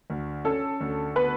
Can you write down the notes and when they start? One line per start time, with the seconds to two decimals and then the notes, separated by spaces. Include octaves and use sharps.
0.10 D2
0.45 C#4 A4
0.81 D2
1.15 B3 B4